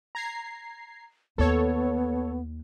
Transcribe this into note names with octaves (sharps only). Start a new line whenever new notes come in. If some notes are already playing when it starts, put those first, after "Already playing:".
A#5 G#6 C7
D#2 B3 A4 C#5